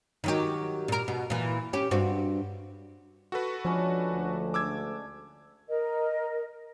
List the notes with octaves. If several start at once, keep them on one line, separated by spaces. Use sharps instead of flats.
D#3 F#3 G4
A#2 A#4
B2
A#2 E3
C#4 G4
G2 C4 F#4
F#4 A4 B4
F3 G#3 C#4 D4
D2
D6 E6 G#6
A#4 D#5